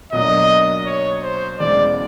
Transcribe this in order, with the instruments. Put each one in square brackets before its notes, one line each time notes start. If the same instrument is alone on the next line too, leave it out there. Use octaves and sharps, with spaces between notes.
[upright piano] B1 B2 F#3 A#3 D4 [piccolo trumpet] D#5
[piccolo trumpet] C#5
C5
[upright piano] E1 E2 C#3 E3 G#3 [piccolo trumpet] D5